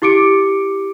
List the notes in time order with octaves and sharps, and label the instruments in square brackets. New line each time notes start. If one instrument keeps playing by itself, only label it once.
[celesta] E4 G4 D6 C#7 D7